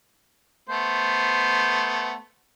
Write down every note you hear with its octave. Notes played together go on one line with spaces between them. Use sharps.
A3 B3 C5